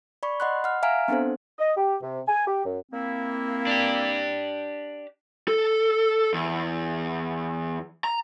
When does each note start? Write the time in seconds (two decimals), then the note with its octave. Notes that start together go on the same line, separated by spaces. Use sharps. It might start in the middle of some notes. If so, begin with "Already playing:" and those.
0.23 D5 B5 C#6
0.40 D#5 F#5 B5 C6 F#6
0.64 F#5 F6
0.83 E5 F5 G#5 A#5 F6 D7
1.08 B3 C4 D4 A4 C5
1.59 D#5
1.77 G4
2.02 C3
2.28 G#5
2.46 G4
2.65 F#2
2.92 A#3 C4 E4
3.67 D4 G4
5.48 A4
6.34 E2
8.04 A#5